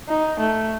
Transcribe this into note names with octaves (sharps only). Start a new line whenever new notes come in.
D#4
A3